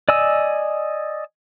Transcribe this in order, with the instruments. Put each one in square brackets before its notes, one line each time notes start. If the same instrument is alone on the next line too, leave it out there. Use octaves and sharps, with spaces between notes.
[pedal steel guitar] D5 D#5 G#5 E6